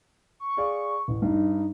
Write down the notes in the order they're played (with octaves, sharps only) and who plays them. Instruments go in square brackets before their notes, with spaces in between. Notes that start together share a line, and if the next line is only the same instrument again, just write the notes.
[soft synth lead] C#6
[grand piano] G#4 D5 F5
A1
[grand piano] G2 [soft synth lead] D#4